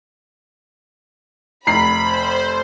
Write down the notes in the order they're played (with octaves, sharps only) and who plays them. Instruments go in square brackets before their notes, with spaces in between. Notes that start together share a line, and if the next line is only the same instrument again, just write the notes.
[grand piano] F1 [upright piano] A#5 C7 [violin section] B5
[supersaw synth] C5